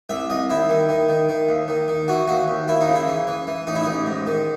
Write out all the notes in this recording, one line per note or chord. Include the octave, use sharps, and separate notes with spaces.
C2 E5
C2 D#5
D#2 E4
D#3
D#3
D#3
D#3
D#2
D#3
D#3
E3 F#4
D#2 F#4
D#2
D#2 E4
D#4
C#3
E4
E3
E3
E3
A1 D#4
E4
A1 D#4
G#2
D#3